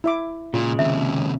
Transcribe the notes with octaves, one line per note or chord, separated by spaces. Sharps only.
E4 E5 D6
A#2 C#3 G#3 F4
D#2 C3 E5